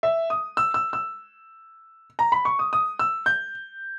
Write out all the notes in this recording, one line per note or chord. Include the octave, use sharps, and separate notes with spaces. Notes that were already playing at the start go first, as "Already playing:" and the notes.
E5
D#6
E6
E6
E6
A#5
B5
C#6
D#6
D#6
E6
G6